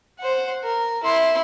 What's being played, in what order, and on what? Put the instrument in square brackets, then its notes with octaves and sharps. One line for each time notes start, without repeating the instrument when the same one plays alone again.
[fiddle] C5 F#5
A#4
E4 C6